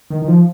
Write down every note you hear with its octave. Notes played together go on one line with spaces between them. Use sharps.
D#3
D#3
F3